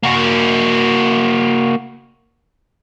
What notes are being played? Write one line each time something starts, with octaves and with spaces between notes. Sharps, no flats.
A#3 F#4